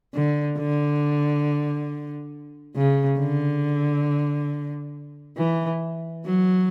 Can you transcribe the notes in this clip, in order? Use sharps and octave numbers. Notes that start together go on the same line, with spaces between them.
D3
D3
C#3
D3
E3
F#3